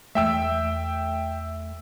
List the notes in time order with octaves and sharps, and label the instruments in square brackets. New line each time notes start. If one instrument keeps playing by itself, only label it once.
[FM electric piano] E2 A3 [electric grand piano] E5 G5 E6